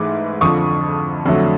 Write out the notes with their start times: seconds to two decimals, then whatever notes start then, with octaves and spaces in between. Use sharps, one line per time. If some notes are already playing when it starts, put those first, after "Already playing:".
Already playing: G#2 E3 A3 D6
0.41 F2 D3 F3 C#6 D#6
1.26 F2 D3 F#3 A3